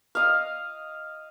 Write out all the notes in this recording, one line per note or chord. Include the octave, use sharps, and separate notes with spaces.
D#5 F5